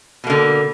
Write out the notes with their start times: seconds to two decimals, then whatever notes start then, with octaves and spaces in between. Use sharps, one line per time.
0.24 B2
0.27 A#3
0.30 D3